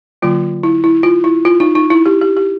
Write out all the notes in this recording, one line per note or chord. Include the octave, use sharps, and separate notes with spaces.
D3 F#3 A#3 F4
E4
E4
F4
E4
F4
D#4
D#4
E4
G4
G4
G4